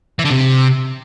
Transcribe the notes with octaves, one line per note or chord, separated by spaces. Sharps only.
E3
D3
C3